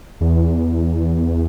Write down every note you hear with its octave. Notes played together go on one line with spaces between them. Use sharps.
E2